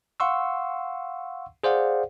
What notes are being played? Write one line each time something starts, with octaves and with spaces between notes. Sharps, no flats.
F5 F#5 C6 C#6 E6
G#4 C5 D5 F5 F#5